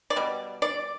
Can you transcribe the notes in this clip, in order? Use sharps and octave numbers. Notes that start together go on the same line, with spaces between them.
D5
B2 G3
D5